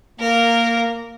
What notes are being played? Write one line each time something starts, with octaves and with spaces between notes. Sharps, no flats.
A#3 A#4